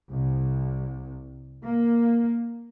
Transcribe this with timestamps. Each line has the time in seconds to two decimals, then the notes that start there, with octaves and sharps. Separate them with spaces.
0.11 C2
1.64 A#3